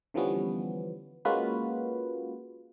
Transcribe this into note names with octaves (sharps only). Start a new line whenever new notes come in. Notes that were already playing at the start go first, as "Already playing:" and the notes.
D3 E3 F3 G3 B3 C#4
G#3 A#3 C#4 F4 F#4 B4